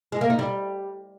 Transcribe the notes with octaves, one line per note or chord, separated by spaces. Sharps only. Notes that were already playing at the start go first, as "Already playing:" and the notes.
G#3
A#3
D#4
G3